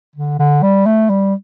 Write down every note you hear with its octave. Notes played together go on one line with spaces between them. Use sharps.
D3
D3
G3
A3
G3